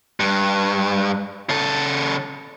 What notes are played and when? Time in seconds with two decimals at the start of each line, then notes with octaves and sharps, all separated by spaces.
0.20 G2
1.49 C#3 A4